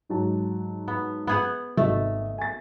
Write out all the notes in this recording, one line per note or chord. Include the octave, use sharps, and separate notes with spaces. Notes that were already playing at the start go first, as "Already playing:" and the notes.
G#2 F#3 A5
B3
B3 G#4 F#5
G#1 A3 D#5
G#5 A6